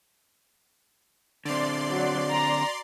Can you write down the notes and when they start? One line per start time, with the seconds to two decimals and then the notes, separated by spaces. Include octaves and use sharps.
1.45 D3 C4 D5 C6
1.89 F#3
2.31 A#5